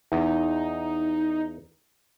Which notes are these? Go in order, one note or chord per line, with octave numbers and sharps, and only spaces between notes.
E2 D#4